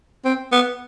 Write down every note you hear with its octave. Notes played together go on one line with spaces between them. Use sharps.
C4
B3